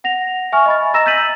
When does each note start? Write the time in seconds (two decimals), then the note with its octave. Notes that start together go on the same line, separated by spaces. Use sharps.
0.04 F#5 A#6 F7
0.52 E5 G#5 C#6 F6
0.66 D#5 B5 A6
0.94 D#5 A#5 E6 A#6 E7
1.06 E6 G6 A6 B6 D#7 F#7